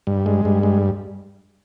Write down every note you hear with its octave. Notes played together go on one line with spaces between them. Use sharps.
G2
G#3
G2
G#3